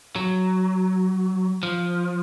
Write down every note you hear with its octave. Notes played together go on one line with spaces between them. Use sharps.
F#3
F3